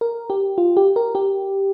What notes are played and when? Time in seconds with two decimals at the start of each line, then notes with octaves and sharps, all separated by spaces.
0.01 A#4
0.30 G4
0.58 F4
0.77 G4
0.96 A#4
1.15 G4